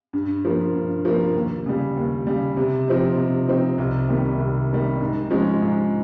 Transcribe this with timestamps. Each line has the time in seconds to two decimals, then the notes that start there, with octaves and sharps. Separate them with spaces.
0.13 G2
0.45 F3 A#3
0.75 G2
1.05 F3 A#3
1.35 D#2
1.66 C#3 G3
1.97 D#2
2.27 C#3 G3
2.57 C3
2.88 F3 C4 D#4
3.17 C3
3.49 F3 C4 D#4
3.78 C2
4.09 C3 D#3 G3
4.39 C2
4.69 C3 D#3 G3
5.01 G#2
5.30 F3 G#3 C#4
5.62 G#2